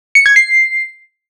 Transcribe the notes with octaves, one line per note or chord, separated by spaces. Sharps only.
C#7
G#6
C7